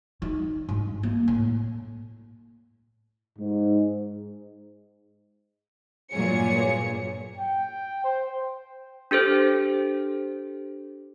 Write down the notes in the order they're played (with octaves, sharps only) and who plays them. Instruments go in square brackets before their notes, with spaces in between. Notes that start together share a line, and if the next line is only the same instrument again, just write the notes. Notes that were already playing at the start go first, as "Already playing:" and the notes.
[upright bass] D#3
G#2
A#3
A2
[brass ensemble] G#2
[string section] G2 A#2 F#3 G#4 C#5 C#7
[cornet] G5
C5
[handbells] D4 G4 A4 C5